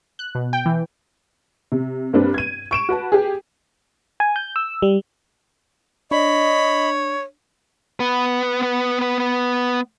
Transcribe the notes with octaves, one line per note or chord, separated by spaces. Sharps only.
F#6
B2
G5
E3
C3
G2 A#3 C4 D4 B4
G#6 D#7
C#6 D7 E7
F#4 B4 A5
G4 G#4
G#5
G6
E6
G3
D4 C#5 D#5 B5
B3 B4